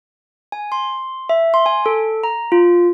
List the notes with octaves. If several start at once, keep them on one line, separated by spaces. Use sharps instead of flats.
G#5
C6
E5
C6
G#5
A4
A#5
F4